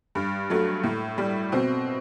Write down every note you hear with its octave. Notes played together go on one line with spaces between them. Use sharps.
G2
F#3 A3
A2
G3
B2 C4